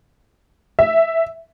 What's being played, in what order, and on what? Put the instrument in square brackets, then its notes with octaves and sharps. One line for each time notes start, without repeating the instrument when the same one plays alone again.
[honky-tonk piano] E5